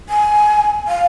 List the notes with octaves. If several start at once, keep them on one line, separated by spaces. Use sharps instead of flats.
G#5
F5